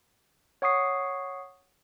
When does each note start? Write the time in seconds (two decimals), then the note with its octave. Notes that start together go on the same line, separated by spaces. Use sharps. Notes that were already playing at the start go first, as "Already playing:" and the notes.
0.62 C#5 F#5 C#6 D#6 C7